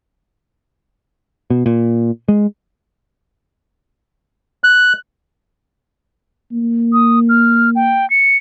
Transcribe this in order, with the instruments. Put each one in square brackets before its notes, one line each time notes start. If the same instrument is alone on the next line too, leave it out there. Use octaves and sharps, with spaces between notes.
[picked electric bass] B2
A#2
G#3
[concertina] F#6
[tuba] A#3
[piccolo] D#6
F6
G5
C#7